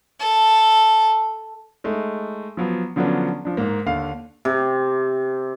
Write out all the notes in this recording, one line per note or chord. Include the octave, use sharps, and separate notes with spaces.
A4
G#3 A3 D#4
F3 F#3 B3
D3 F3 F#3 B3 C#4 D4
F3 D4
G#2 A#3
D#2 D3 F5
C3